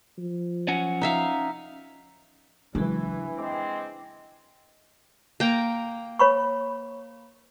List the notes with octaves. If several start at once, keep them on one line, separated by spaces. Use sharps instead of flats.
F3
C#4 F#5 G#5
D#4 E5 F5
C#3 E3 F#3 G#3 D4
G#3 C4 D6
A#3 G5 A#5
C#5 B5 C#6